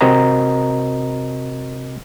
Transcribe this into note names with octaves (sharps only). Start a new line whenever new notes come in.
C3 C4 F#4 A#4 D#5 A#5